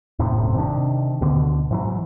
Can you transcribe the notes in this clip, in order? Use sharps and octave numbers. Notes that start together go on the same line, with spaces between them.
D#2 A2 C3
D1 F#2 A2 C3
C3 D#3 D4
D2 B2 D3
G#2 E3 F#3